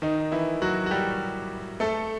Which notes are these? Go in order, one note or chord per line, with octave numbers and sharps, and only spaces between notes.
D#3 D#4
E3 E4
F#3 F#4
F#4
G3 G4
A3 A4